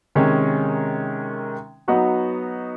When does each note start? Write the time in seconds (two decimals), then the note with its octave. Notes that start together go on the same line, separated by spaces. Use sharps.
0.15 C3 D#3 G#3 C#4
1.88 F#3 B3 D#4 F#4